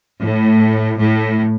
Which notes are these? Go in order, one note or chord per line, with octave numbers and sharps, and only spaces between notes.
A2
A2